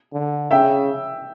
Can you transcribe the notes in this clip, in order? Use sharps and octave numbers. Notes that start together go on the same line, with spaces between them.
D3
C#3 E5 G5